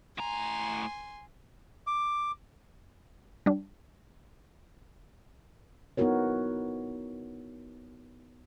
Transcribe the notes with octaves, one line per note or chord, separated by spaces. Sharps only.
A2 G#5 A#5 C6
D6
G3 D4
B3 D#4 E4 F#4 A#4 C#5